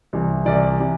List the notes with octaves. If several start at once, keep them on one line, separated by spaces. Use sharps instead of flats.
C2 C3 E3
C2 C3 E3 D5
C3 E3